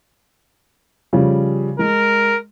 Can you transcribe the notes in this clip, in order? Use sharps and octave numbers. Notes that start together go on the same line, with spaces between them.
C#3 F3 G3
G#3 A#4